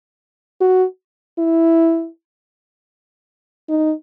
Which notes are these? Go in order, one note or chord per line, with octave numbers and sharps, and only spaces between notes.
F#4
E4
D#4